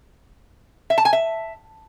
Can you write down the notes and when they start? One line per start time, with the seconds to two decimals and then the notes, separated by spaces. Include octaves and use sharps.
0.90 E5
0.98 A5
1.05 G#5
1.13 E5